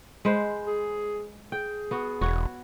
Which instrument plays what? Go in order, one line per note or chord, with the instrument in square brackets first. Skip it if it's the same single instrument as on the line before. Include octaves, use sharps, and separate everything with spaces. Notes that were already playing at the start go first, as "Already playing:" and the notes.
[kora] G#3 B4 C5
[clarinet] G#4
[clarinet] G#4 [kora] G5
[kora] B3 F#4
[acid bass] E1 [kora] F#4 C#5